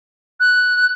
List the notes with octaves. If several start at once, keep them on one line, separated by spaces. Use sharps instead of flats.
F#6